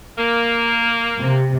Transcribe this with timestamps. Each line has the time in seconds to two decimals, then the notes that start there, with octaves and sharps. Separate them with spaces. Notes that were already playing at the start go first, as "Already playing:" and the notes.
0.18 A#3
1.19 C3